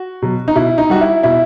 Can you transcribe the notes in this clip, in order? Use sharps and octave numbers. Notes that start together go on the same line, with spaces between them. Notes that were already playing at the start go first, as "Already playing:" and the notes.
Already playing: F#4
B2 F#3
D#4
B2 E4
D#4
G3 F#4
E4
B2 E4